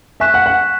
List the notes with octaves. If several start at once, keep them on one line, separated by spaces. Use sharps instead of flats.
E5 G#5 C#6 F#6 B6 E7
F#5
F#5